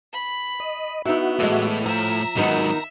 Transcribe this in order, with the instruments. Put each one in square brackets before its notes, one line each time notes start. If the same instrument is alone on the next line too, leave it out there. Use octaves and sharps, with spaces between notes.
[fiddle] B5
[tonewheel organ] D#5
[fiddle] B3 [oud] D#4 E4 [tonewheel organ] F#4 E5
[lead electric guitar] A2 [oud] E3 G#3
[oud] F3 [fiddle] E5 [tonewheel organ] A#5
[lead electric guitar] G#2 F#3 [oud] D#3 B3 D#4